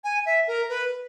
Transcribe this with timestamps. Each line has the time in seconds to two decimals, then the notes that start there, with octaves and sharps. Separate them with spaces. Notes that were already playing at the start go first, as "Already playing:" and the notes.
0.04 G#5
0.26 E5
0.47 A#4
0.69 B4